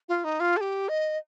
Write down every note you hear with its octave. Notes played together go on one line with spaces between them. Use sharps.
F4
D#4
F4
A4
G4
D#5